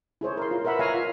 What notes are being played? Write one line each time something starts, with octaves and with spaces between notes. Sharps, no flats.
E4 G#4 C5 C#5
A#4 C6
F4
A#4 B4 E5 F#5 B5
C#5 D#5 F5 G#5 A#5
F4 A#4 F5